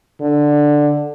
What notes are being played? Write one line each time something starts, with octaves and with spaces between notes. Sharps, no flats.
D3